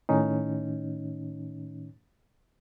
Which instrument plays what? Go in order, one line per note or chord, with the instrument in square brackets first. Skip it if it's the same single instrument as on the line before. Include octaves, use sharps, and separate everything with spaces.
[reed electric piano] A2 D#3 C#4 D#4